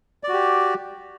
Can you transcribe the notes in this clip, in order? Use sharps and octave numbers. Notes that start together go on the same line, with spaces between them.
F#4 G4 D5